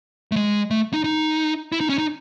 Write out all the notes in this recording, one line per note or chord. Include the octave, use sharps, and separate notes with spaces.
A3
G#3
A3
D#4
D#4
E4
D#4
C#4
D#4